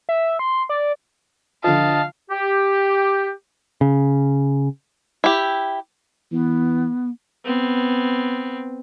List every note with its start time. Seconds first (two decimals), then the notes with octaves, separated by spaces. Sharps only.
0.09 E5
0.39 C6
0.69 D5
1.64 D3 F3 D#5 F5 A5
2.30 G4
3.81 C#3
5.24 E4 G4
6.32 E3 B3
7.45 B3 C4